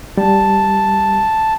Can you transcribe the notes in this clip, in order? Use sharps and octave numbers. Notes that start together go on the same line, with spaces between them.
G3 A5